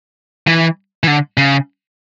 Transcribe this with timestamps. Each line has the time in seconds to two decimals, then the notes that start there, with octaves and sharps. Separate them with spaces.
0.47 E3
1.04 E3
1.07 D3
1.37 C#3